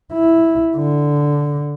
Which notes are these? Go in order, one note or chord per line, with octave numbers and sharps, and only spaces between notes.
E4
D3